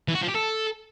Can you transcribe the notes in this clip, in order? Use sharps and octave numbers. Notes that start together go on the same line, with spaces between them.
E3
F#4
F3
G4
A4